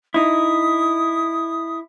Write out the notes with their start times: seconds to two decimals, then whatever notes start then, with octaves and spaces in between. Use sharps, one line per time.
0.14 D#4 E4 D#6